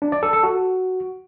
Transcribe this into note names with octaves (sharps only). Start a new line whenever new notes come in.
D4
D5
A4
A4
F#4